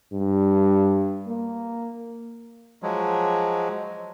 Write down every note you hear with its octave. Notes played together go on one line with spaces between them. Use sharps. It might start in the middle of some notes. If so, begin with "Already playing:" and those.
G2
A#3
F3 F#3 G#3